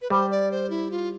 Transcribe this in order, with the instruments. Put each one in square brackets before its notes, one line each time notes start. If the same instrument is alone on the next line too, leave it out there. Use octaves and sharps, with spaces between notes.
[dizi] B4
[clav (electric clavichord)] G3 [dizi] C5
[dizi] D5
C5
E4
F4